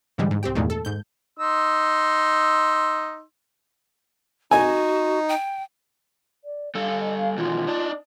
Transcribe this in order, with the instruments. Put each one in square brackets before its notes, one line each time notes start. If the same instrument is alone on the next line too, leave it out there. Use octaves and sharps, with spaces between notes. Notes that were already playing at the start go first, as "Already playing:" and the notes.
[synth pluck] G#2 D3 E3 G3 G#3
G#2
C2 C4 G4 G5
E2 G2 A#2 D#3 G#3 A3
A4
G#2 G6
[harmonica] D#4 C6 E6
[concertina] D#4 [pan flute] F#4 [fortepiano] G#5
[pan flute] G5
[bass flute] D5
[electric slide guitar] G3 A4 [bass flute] F5
[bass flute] D#5
F5
[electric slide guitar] B2 D#3 E3 [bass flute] F4
[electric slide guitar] D#4 D5 A5